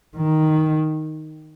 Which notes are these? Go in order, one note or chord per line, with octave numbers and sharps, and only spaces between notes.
D#3